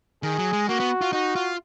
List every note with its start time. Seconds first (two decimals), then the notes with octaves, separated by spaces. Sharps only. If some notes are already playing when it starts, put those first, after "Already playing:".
0.23 D#3 G#4
0.38 F#3
0.53 G#3
0.69 A#3 F#4
0.80 B3
1.01 F4
1.13 D#4 F#4
1.35 F4